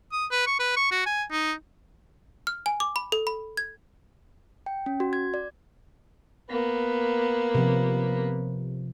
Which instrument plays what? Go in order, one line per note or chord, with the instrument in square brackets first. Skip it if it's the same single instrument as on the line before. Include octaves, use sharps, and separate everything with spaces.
[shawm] D#6
B4
C#6
B4
C#6
F#4
G#5
D#4
[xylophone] F6
G#5
D6
B5
A4
B5
G#6
[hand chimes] G5
C#4
F#4
G#6
D5
[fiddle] A#3 B3
[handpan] C3 F3